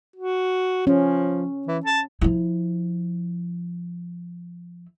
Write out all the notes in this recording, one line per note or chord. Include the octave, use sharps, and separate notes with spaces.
F#4
F3 C#4
E3
A5
F3 E4